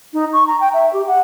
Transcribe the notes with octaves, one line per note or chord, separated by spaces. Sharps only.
D#4
C#6
A#5
G5
E5
G4
F#5